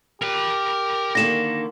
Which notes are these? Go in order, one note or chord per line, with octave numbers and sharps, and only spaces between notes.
G4 A#4 B5
D3 D#3 A#3 A#6 E7